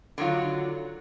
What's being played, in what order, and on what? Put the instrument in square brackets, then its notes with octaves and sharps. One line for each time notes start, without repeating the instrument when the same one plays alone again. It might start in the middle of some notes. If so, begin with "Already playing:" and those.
[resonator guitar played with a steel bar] D3 D#3 F#3 F4